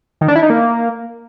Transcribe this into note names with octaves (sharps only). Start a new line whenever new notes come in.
D#3
D4
E4
D#4
A#3